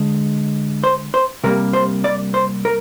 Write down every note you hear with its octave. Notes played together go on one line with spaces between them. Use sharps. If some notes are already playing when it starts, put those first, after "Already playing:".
Already playing: D3 G#3
C5
C5
C3 G3 A#3 A#4
C5
D5
C5
A#4